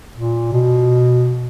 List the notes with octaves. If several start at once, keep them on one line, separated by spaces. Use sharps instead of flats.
A#2
B2